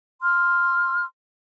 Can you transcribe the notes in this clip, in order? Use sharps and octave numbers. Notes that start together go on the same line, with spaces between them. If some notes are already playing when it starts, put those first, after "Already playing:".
C6 E6 F6